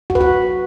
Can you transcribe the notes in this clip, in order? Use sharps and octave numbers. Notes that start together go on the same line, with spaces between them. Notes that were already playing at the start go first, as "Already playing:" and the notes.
F#4
B4
F#4